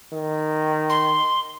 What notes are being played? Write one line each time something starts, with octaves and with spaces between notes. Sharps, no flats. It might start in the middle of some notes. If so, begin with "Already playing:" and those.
D#3
C6